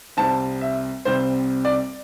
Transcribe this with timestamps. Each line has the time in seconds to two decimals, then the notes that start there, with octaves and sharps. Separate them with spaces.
0.17 C2 C3 G3 C4 A5
0.61 E5
1.05 C2 C3 G3 C4 C5
1.65 D5